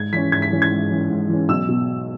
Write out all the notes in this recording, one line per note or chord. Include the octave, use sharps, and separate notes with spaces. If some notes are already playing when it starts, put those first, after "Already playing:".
Already playing: G#2 G#6
E3 C#4 B6
G#2 G#6
B6
E3 C#4
G#6
G#2
E3 C#4
G#2
E3 C#4
B1 E6
B2